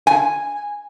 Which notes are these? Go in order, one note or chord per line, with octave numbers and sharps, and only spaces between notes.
G#5